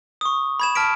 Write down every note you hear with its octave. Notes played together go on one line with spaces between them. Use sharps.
C#6 D#6
B5 G#6 E7
A5 F6 B6 D7